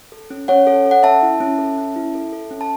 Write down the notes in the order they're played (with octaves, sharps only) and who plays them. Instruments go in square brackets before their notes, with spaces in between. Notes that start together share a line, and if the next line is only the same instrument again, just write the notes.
[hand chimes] A4
C#4
C#4 C#5 F#5
A4
A4
F#5
C#4 E5 A5
E4
C#4
A4
C#4
E4
A4
A4
C#4
A5